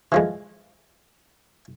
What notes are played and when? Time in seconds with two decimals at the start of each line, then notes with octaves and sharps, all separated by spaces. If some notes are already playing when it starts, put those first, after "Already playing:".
0.12 E3 F3 G#3